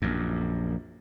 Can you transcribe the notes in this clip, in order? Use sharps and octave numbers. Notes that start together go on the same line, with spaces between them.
A#1 F#2